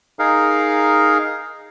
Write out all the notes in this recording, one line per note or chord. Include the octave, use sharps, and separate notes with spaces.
D#4 G#4 A#4 F5